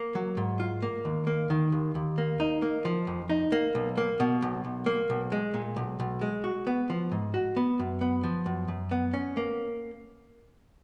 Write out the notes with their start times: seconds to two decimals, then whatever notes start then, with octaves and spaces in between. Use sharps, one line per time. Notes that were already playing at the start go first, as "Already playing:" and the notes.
Already playing: A#3
0.15 F#3
0.37 G#2
0.60 F4
0.82 A#3
1.05 D#2
1.27 A#3
1.50 D#3
1.72 D#2
1.95 D#2
2.18 A#3
2.40 D#4
2.62 A#3
2.85 F3
3.07 F2
3.30 D#4
3.52 A#3
3.75 B1
3.98 A#3
4.20 B2
4.42 B1
4.65 B1
4.86 A#3
5.10 B1
5.32 G#3
5.54 A#2
5.76 B1
6.00 B1
6.21 G#3
6.44 F#4
6.67 B3
6.90 F3
7.12 G#2
7.34 F#4
7.57 B3
7.79 F#2
8.01 B3
8.23 F3
8.46 F#2
8.68 F#2
8.91 B3
9.14 C#4
9.37 A#3